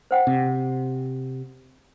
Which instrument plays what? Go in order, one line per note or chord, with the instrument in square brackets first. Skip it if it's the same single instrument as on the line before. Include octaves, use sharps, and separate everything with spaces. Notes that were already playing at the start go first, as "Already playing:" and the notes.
[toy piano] C5 F#5 G5
[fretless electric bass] C3